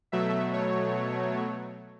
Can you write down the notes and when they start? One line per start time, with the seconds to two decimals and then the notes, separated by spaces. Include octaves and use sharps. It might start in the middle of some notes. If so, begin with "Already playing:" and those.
0.12 B2 F#3 A3 E5
0.53 C#5